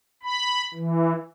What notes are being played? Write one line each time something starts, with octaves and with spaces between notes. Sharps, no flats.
B5
E3